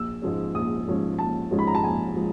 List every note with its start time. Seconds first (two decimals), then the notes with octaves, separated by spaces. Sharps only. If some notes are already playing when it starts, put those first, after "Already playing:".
Already playing: A#1 E6
0.22 G#2 F3 G#3 C#4
0.55 A#1 D#6
0.87 G#2 F3 G#3 C#4
1.19 A#1 A5
1.51 G#2 F3 G#3 C#4
1.59 B5
1.67 A#5
1.75 A5
1.83 A#1 G#5
2.16 F3 G#3